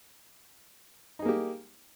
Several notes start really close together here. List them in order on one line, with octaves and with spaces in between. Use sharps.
D#4 G#4 A#3 G4